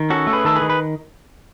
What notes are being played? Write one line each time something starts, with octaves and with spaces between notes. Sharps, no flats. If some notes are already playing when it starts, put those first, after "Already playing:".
Already playing: D#3
C#4 F#4 A4
A3
G#4 B4
D#3 A4
G#4 B4
D#3
B4